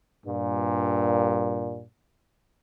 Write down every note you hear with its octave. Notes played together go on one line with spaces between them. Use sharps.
G2 A#2